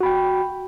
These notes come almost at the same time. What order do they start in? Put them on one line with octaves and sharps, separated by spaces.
F#4 B5 G5